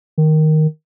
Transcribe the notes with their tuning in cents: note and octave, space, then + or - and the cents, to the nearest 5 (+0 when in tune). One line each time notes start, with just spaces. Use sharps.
D#3 +0